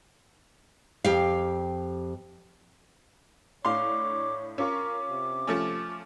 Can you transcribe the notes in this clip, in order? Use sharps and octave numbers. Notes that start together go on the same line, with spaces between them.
F2 G4 F5
A2 D4 C#5 F5 C6 D6
C#4 F4 A#4 C#6 D6
C3
F3 A3 C#4